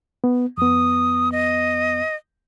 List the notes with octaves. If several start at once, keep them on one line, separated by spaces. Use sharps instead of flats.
B3
F2 B3 D#6
D#5